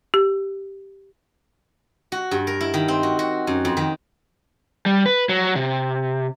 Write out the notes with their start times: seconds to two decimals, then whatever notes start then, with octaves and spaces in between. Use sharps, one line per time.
0.14 G4
2.12 F#4
2.31 G2
2.47 A#4
2.61 E4
2.74 D#3
2.88 C4
3.03 F#4
3.19 F#4
3.47 F#2
3.65 F2
3.77 D#3
4.86 G3
5.06 B4
5.29 F#3
5.55 C3